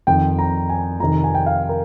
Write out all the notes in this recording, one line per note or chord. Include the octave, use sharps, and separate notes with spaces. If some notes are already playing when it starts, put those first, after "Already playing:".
F2 D#3 G5
A#5
G#5
F2 C3 D#3 A#5
G#5
G5
F5
A#4